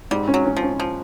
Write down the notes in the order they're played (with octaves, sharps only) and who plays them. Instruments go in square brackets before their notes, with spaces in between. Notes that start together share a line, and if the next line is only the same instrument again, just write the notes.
[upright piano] G#2 [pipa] G3
[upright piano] C#4
[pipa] F#3
[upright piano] C#4
[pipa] F3
[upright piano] C#4
[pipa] F3